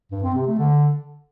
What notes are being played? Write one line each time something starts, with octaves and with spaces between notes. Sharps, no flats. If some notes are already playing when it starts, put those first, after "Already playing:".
G2
C4
C3
A3
D3